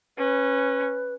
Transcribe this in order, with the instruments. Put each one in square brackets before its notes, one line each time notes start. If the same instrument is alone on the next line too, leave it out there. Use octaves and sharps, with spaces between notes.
[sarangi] C#4 [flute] B4